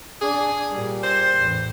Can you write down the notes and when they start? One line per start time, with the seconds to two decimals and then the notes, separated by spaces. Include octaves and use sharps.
0.21 D4 G#4
0.71 A#2 G3
1.03 C5
1.38 A1 E2